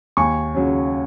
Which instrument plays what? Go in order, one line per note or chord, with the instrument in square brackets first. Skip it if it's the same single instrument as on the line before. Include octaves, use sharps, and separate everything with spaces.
[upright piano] D#2 G#5 C#6
C#3 F#3 C#4